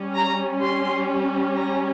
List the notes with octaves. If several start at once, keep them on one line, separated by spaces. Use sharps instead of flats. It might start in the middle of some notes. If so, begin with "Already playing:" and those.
Already playing: G3 C#4
A#5
C6
A#5